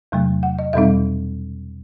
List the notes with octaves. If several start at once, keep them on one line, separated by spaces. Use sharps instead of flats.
E2 C3 F#3 A3
F#5
D#5
E2 B2 G3 C4 D#4 E5